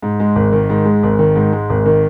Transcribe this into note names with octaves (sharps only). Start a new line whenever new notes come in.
G#2
G#3
G#1
D#3
G#2
G#3
G#1
D#3
G#2
G#3
G#1
D#3